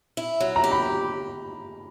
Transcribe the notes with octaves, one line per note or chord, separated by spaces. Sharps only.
E4
F#3
A#5
G4
B5